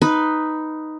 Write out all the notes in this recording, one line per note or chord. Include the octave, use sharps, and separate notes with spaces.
D#4 B4